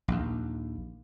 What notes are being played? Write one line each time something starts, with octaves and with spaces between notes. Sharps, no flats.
A#1 D#2